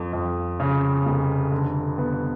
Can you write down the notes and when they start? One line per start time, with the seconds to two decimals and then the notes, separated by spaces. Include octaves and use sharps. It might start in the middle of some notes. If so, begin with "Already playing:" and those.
Already playing: F2
0.13 F2
0.60 C#3
1.06 F1
1.51 D3
1.98 B3